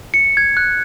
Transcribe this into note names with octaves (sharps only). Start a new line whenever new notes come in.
C#7
G#6
F#6